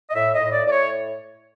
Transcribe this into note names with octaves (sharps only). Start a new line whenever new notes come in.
D#5
A2 E5
D#5
A2
D5
A2 D5
C#5